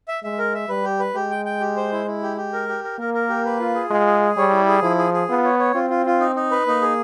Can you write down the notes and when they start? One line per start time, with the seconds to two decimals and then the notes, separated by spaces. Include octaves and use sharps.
0.08 E5
0.23 G#3 E5
0.38 A#4
0.54 E5
0.68 G3 B4
0.84 G4
0.99 B4
1.15 G#3 G4
1.31 G5
1.45 G5
1.61 G4
1.76 C5
1.92 E4
2.07 E4
2.22 G4
2.37 G4
2.53 A#4
2.68 G4
2.84 A#4
2.99 A#3 A#4
3.14 A#4
3.29 G4
3.45 B4
3.60 F4
3.75 G#4
3.90 G#3 F4
4.06 G#4
4.22 G#4
4.37 G3 C#5
4.52 E4
4.68 G#4
4.82 F3 E4
4.98 G#4
5.14 G#4
5.29 B3 F4
5.44 C#5
5.59 C#5
5.74 C4 F4
5.90 F4
6.06 F4
6.20 D#4
6.36 D#4
6.51 B4
6.67 A#3 D#4
6.82 G#4